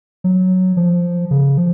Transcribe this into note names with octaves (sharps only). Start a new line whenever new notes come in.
F#3
F3
C#3
F3